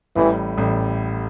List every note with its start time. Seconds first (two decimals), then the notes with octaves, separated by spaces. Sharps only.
0.16 A1 A2 E3 G3
0.58 A1 A2 G3